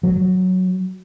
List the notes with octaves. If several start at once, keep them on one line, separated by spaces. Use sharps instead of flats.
F#3